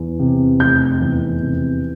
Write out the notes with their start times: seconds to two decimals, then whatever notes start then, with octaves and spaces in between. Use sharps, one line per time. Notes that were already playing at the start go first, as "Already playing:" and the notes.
Already playing: E2
0.19 C3
0.60 F1 G6
1.01 E2
1.41 C3